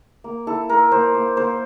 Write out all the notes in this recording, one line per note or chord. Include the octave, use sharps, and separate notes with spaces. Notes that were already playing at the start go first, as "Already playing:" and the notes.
A#3
E4 A4
A#3 A#4
A#3 C5
A#3
A#3 C5